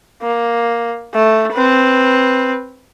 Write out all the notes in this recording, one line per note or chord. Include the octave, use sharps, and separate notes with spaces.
A#3
A3
C4 B4